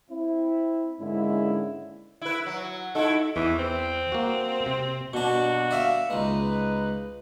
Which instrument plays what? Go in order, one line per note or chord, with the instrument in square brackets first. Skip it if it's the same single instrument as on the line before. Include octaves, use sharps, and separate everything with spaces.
[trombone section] C4 E4
G#2 D3 G#3 A#3 C#4 E4
[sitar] E4 B4
F#3
[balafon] D#4 D#5 [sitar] E4 F#4 A4
[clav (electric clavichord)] E2 [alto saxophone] E3
[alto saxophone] C4
[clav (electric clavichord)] A#3 F#4
C3
[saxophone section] G2 A#3 F#4 [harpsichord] B2 D4
[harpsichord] D5 E5 F5
[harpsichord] C#2 G#3 [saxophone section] D#4 B4